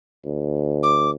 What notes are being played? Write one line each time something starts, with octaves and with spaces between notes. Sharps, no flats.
D2
D6